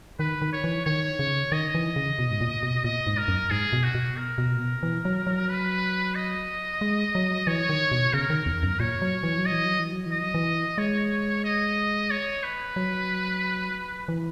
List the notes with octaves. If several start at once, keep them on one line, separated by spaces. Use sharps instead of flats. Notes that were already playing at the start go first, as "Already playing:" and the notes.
D#3 B4
D#3
C#5
E3
D#3 C#5
C#3
D#3 D#5
E3
C#3
B2
G#2
A#2
B2
A#2 D#5
G#2
A#4
F#2
G#2 G#4
B2
F#4
B2
A#4
B2
A#2
B2
E3
F#3
F#3
B4
D#5
G#3
F#3
E3 C#5
D#3
B2
C#3 A#4
D#3
E2
F#2
A#2 C#5
F#3
E3
F#3
D#5
E3
F#3
E3
F#3
E3
D#5
F#3
E3
G#3 C#5
D#5
C#5
B4
F#3
E3